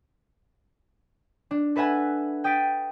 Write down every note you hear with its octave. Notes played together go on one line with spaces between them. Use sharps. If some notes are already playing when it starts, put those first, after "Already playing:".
D4
A4 B4 E5 F#5 G#5 B5
G5 D#6 A6 B6 D7